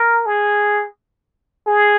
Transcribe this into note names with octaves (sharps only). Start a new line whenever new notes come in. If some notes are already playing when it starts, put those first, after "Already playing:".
Already playing: A#4
G#4
G#4